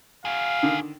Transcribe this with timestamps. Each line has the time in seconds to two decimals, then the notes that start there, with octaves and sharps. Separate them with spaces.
0.25 F#4 G#4 F5
0.63 D3 D#3